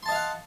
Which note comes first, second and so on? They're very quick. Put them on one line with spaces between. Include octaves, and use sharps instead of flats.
C6 A5 D#5 F5 F#5